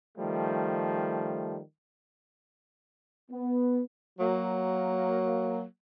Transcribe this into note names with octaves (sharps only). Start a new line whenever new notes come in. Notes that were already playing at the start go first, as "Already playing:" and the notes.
D#3 F3 G3 A3
B3
F#3 A#3